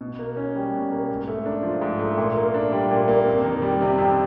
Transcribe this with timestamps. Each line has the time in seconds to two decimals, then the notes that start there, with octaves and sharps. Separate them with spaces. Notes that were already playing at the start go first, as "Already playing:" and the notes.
0.01 B2
0.19 A#3
0.37 C#4
0.56 G3
0.73 B2
0.91 A#3
1.09 G#2
1.28 A3
1.46 D4
1.63 F3
1.81 G#2
1.99 A3
2.18 A#2
2.36 A#3
2.54 D4
2.72 G3
2.91 A#2
3.08 A#3
3.27 F2
3.44 D#3
3.62 G3
3.81 C3
3.98 F2